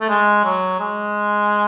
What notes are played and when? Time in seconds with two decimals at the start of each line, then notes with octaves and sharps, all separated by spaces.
0.01 A3
0.09 G#3
0.45 F#3
0.80 G#3